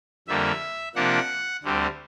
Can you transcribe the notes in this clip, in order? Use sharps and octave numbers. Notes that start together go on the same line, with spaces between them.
F2 D3 G3 A#3 E5
C3 F3 A#3 D4 F#5
D2 D3 G3 C4